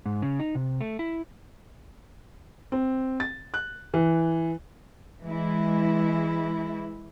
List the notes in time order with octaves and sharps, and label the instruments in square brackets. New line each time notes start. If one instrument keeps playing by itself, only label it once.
[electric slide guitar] G#2
C#3
D#4
C3
A3
E4
[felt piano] C4
A6
F#6
E3
[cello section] E3 G#3 E4